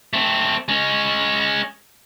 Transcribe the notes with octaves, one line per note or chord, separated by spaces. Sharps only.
A3 C4
G#3 C#4